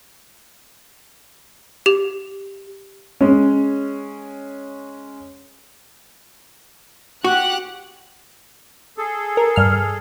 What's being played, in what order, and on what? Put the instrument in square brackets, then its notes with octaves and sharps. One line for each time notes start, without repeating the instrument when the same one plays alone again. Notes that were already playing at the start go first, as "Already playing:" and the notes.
[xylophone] G4 F7
[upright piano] G#3 C#4
[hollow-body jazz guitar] F#4 [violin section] G4 F#5 F#6
[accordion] G#4 A4
[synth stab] A#4
G2 F6